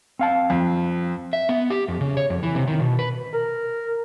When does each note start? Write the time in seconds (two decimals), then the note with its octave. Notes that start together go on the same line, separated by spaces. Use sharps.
0.19 C4 F5 A5
0.50 F2
1.33 E5
1.49 B3
1.70 G4
1.88 F2
2.01 C#3
2.17 C#5
2.30 F2
2.43 E3
2.55 C3
2.67 D#3
2.79 B2
2.99 B4
3.33 A#4